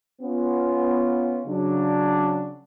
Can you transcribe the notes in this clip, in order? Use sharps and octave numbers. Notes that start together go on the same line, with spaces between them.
B3 C#4 F4
C#3 F#3 D4